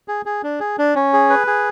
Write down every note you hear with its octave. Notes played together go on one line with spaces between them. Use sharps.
G#4
G#4
D4
G#4
D4
C#4
G#4
B4
G#4